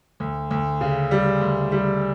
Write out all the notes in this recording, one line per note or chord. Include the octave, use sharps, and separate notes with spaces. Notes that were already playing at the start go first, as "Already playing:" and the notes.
D2
D2
C#3
G3
D2
G3